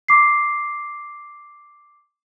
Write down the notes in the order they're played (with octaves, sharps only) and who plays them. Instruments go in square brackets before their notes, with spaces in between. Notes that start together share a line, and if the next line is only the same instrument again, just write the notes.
[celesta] D6 C7